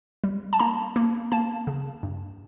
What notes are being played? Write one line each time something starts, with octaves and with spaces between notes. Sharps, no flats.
G3
A5
A#3 A#5
A#3
A#3 A5
C#3
G2